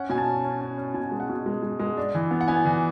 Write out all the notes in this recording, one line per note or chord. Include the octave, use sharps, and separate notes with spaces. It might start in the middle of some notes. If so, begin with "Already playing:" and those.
Already playing: C#4 F#5
B2 G#5
A5
C#4
C#4
C#4
C#4
B2 G#5
G#3
F#5
B2
G#3
G#3
G#3
D4
E3
B3
F#5
B3 G#5
E3